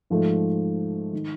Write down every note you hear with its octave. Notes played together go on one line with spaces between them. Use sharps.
G#2 F3 A3
D#3